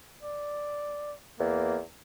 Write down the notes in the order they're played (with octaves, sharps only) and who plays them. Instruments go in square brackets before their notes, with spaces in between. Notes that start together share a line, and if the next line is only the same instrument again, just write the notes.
[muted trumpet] D5
[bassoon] E2 [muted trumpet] A#3